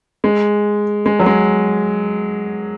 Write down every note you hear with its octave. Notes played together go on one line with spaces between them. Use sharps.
G#3
G#3
F#3
G#3